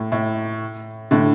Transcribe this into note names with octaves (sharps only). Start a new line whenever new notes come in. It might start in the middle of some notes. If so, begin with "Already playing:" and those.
Already playing: A2
A2
A2 D3